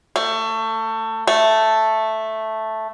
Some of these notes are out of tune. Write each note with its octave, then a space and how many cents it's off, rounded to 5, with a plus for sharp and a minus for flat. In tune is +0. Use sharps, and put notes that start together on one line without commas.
A3 +25
A3 +0